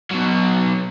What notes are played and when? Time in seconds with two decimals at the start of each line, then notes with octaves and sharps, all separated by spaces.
0.11 B2 F#3